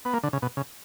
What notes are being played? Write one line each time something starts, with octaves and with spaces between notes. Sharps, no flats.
B3
A#3
D3
C#3
B2
C#3